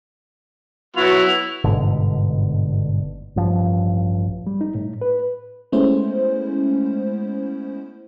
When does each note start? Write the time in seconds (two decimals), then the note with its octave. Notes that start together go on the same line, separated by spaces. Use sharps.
0.96 F#3 B3 E4 F#4 F7
1.64 G1 G#2 B2 D3
3.36 A1 G2 F3
4.47 G3
4.61 D#4
4.75 A2
5.01 B4
5.72 G#3 A3 B3 C#4 E4 C5